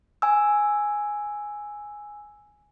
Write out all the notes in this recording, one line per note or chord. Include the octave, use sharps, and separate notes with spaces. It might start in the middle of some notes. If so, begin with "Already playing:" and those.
G#5 E6